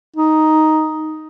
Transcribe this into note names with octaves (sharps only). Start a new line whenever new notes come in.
D#4